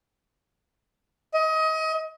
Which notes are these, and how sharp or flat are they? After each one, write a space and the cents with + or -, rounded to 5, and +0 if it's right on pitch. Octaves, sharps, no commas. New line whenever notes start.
D#5 +30